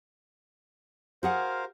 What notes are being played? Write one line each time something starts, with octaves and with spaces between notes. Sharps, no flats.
F#4 G#4 A#4 C5 F5 F#5